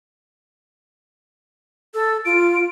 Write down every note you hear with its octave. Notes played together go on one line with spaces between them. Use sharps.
A4 E6
F4 D7